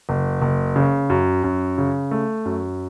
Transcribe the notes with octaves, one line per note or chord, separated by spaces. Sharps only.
F#1
F#1
C#3
F#2
F#2
C#3
A3
F#2